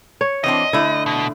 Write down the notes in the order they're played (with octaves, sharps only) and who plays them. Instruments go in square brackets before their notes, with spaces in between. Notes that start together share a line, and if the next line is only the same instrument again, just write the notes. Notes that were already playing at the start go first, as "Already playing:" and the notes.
[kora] C#5
[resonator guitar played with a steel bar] E3 C4 D4 [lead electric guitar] D#5
[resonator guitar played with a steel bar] D3 A3 [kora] E4
[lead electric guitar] B2